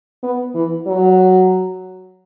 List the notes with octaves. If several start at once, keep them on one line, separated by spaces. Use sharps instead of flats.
B3
E3
F#3